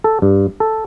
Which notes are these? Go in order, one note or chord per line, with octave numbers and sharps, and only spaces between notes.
A4
G2
A4